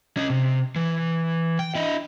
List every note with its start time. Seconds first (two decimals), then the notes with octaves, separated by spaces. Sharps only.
0.17 C#4 D#5
0.30 C3
0.76 E3
1.59 G5
1.75 E4 D#5